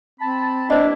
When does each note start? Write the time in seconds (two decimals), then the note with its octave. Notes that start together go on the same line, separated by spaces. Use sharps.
0.20 C4 A5 B5
0.70 G2 A#3 D4 E4 C5 D#5